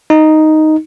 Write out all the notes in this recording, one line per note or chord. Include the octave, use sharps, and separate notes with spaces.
D#4